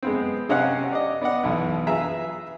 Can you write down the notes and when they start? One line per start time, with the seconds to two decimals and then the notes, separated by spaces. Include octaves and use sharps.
0.03 G#3 B3 C4
0.49 C3 C#4 D#5 F5 F#5 F#6
0.92 D5 D#5
1.21 B3 D5 D#5 F#5
1.44 B1 B2 E3
1.87 F4 G#4 B4 E5 A#5